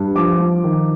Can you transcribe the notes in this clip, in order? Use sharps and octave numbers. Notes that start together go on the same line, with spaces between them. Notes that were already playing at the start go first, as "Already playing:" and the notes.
Already playing: G2
F3 D6
F3
D#3